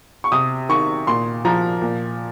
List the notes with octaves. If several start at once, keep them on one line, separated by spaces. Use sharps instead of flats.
C#6
C3 D#6
D#3 C#6
A#2 C6
F3 A#5
A#2